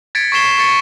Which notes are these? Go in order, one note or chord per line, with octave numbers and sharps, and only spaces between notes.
G#6 A6 B6 C#7 D7
C#6 G#6 B6 C7 E7 G7
C#6 A6 C#7